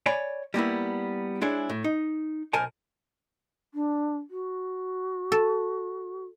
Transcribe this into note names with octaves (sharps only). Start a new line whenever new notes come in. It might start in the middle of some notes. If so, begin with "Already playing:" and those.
C#5 D5 G#5 B5
G3 A#3 B3 E4
G#3 D4 E4 G#4 C#5
A2
D#4
B1 A#4 C5 G#5 A5
D4
F#4
A4